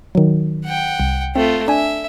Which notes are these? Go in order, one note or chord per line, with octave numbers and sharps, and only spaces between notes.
D#3 F#3
F#5 G5
C2
A3 C4 F4
D4 E5 G#5